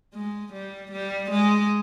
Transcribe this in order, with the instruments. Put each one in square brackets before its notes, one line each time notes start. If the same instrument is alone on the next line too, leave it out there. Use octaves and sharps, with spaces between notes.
[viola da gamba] G#3
G3
G3
G#3